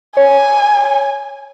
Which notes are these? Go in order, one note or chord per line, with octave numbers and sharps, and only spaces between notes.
C#5 G#5